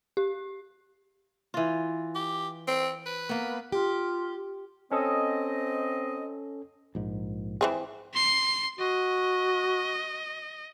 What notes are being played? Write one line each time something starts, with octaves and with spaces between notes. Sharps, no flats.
G4
E3 F4
G4
C4
B4
A#3 B3
F4 G4
C4 C#4 A4 D#5
A#1 G#2
E3 C4 G#4
C6 C7
F#4 D#5